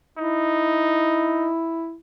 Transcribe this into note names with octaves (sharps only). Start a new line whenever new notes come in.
D#4 E4